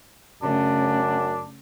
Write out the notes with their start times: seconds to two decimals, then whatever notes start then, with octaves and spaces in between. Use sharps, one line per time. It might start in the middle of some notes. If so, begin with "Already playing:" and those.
0.42 F#2 C#3 A3 D4